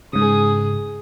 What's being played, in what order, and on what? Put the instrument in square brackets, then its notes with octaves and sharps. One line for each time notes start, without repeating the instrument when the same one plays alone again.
[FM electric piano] G#2 C#3 [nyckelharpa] G#4 D#6